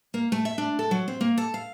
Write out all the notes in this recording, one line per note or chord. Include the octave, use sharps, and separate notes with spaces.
A#3
A3
E5
D4
A4
F#3
C4
A#3
A4
F5